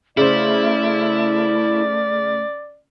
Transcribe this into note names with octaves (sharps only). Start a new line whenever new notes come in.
C#3 A3 E4 C5 D5